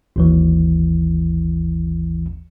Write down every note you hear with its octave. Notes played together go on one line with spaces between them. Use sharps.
G#1 D#2 E3